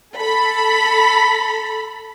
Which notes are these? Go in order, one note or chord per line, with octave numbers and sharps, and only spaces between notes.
A4 B5